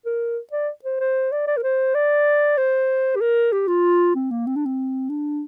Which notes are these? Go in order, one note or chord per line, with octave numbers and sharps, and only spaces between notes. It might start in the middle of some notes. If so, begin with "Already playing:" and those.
A#4
D5
C5
C5
D5
D5
A#4
C5
D5
C5
G4
A#4
G4
F4
C4
A#3
C4
D4
C4
D4